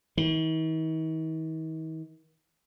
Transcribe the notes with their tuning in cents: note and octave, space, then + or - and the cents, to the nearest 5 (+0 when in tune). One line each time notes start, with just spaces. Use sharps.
D#3 +45